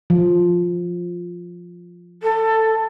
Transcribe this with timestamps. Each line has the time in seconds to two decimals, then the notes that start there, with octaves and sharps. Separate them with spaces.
0.10 F3
2.23 A4